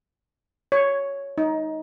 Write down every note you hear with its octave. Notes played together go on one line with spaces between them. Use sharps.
C#5
D#4